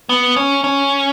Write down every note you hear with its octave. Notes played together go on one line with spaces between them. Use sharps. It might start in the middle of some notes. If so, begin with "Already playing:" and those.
B3
C#4
C#4